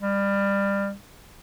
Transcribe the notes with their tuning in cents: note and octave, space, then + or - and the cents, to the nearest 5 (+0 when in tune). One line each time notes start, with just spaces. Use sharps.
G3 +25